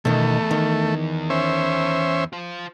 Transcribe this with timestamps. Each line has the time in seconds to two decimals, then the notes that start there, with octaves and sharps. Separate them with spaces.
0.05 E2 B2 D#3 A3
0.51 D#3
1.30 C#4 C5 E5
2.33 F4 C5